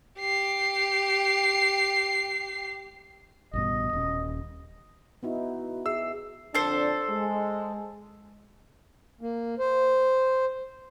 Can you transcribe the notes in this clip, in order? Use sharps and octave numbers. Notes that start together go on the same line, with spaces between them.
G4 C7
A1 G2 B2 D#5
D#1 C#4
B3 D#4 E4 F#4
G#4 E5 E6 C7
F2 D3 D4 A4 C5
G#3
A#3
C5